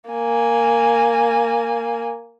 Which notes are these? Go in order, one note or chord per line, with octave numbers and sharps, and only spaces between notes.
A#3 G#5